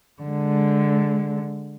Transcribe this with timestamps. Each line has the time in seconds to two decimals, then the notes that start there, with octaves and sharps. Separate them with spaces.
0.22 D3 G#3